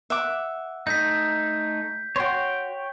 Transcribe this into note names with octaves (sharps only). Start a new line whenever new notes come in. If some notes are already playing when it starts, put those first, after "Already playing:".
E5 F#5 D6
A3 D#4 G6 B6
F#4 C#5 G5 C6